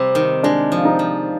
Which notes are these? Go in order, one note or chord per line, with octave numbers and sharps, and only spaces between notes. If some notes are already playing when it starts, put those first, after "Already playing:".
Already playing: C3 G3 C4
D#3
G#3 D4
F3
D#4
F3